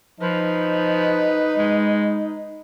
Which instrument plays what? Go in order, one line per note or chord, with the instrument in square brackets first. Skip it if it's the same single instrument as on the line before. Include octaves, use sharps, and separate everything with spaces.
[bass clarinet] F3 [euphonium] D#4 [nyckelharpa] B4
[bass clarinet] G#3